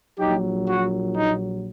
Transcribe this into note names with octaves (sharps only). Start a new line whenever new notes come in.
A#1 A#2 F#3 D#4 G4
F#4
D#4